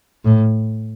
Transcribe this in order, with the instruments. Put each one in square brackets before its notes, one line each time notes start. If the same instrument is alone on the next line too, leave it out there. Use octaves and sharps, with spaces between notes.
[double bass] A2